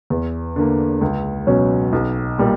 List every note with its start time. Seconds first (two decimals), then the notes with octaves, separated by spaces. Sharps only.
0.10 E2
0.56 D3 A#3
1.01 C#2
1.47 B2 F#3 C#4
1.93 B1
2.38 A#2 G3 A#3